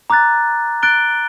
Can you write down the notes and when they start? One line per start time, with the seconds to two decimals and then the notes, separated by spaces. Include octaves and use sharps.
0.10 A#5 D6 F#6 A6
0.83 F#6 A6 D7 G7